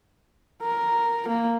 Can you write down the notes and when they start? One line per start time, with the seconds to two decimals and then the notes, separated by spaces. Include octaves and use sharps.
0.62 A#4
1.28 A#3